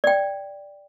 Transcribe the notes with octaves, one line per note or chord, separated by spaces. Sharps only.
D5 G5